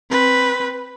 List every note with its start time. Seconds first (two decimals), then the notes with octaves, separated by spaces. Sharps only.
0.11 C4 B4